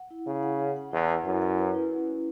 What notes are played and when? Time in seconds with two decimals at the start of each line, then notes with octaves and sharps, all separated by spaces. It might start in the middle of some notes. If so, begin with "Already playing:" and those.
Already playing: F#5
0.11 E4
0.27 C#3 E4
0.43 F#5
0.60 F#5
0.76 F#5
0.92 E2 E4
1.09 F#5
1.25 F#2 E4
1.42 F#5
1.58 B4
1.75 E4
1.91 C#4
2.08 C#4